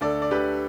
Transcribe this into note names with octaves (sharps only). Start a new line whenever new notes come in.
D2 A4 D5
D5
D2 G4 B4